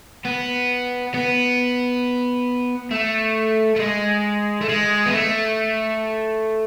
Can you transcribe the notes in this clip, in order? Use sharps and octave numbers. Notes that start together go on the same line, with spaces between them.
B3
B3
A3
A3
G#3
A3
G#3
B3
A3